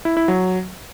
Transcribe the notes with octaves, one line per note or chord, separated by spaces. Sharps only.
E4
E4
F#3